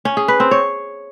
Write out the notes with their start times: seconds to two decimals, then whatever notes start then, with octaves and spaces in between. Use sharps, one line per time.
0.05 C#4
0.17 G#4
0.28 B4
0.40 C4
0.51 C#5